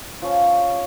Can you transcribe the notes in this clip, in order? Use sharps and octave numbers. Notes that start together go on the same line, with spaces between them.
F3 C#4